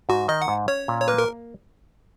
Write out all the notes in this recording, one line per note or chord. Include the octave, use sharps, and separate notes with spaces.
G#2 F#4
D#3 D#5
F#5
G#2
C#4 C#5
A#2
C#5
A#3 B4
A#4